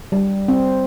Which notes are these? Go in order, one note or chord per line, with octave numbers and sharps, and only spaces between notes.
G3
C4